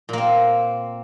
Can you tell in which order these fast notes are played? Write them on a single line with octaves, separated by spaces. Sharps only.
A#2 A#3 C4